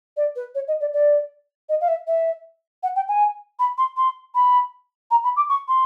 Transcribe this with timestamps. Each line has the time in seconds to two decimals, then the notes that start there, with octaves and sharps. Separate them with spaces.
0.16 D5
0.35 B4
0.54 C#5
0.67 D#5
0.80 D5
0.93 D5
1.69 D#5
1.81 F5
1.88 E5
2.07 E5
2.83 F#5
2.95 G5
3.08 G#5
3.59 B5
3.77 C6
3.96 C6
4.34 B5
5.10 A#5
5.23 B5
5.36 D6
5.49 C#6
5.68 C6